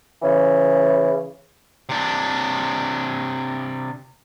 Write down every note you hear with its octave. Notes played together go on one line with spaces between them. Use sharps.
C#3 E3
C3 D4